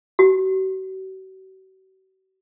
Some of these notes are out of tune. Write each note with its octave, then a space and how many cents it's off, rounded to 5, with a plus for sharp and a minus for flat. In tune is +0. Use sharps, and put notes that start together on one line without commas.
F#4 +45